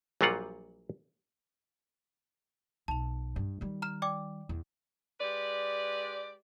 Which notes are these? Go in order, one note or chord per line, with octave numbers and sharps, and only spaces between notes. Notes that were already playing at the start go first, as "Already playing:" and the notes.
A#1 A#2 F#3 G3 F4 F#5
B1 A5 F7
G2
D#3 G3
A#5 F6 E7
D5 G5 D6
E2
G#3 G4 B4 D5